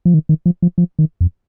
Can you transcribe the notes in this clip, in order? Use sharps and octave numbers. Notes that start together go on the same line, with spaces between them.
F3
D#3
D#3
F3
F3
F3
D#3
F2